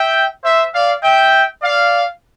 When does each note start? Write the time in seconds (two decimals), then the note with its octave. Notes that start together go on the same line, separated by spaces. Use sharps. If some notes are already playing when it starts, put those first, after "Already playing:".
Already playing: E5 G5
0.44 C5 E5
0.73 D5 F5
1.03 E5 G5
1.62 D5 F5